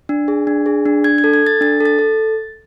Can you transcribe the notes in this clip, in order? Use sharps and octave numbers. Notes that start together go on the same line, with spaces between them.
D4
G#4
D4
G#4
D4
D4 G#6
G#6
A4
G#6
A4 A6
D4 A6
A4
A6
A4